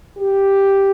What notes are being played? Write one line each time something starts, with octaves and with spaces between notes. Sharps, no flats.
G4